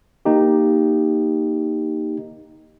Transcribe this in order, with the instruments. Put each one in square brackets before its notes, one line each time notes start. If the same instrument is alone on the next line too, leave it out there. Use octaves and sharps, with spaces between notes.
[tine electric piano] A#3 D#4 G4